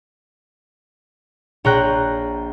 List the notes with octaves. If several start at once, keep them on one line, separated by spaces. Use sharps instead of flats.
A#1 C#5 G5 A#5 F#6